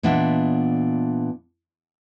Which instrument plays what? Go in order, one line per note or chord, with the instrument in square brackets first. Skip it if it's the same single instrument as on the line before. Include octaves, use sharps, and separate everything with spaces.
[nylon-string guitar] A#2 E3 B3 D4 D#5 E5